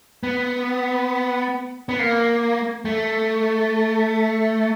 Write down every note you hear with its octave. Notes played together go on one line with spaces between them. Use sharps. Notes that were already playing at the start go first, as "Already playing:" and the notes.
B3
B3
A#3
A3